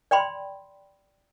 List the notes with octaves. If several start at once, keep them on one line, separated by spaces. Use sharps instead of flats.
D5 G5 B5 C6